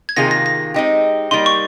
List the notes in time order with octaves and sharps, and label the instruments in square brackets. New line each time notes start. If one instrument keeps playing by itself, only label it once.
[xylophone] G#6
[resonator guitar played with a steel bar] C3 D#3 A#3 F4 G#4 [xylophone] A#6
[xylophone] A#6
A#6
[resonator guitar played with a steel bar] G#3 C4 D#4 G4
[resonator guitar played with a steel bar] G3 A#3 D#4 [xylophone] C6
[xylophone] C#6